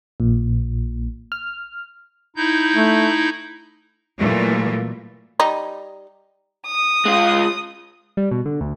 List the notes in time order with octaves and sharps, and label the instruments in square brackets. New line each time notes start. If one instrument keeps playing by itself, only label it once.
[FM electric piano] A#1 A#2
F6
[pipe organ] D#4 E4 G6
[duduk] A3
[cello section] A#2 E3 F#3 G3 A3 A#3
[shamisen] G3 D#4
[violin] D#6
[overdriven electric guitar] G#3 F4
[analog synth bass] G3
B2
D3
D2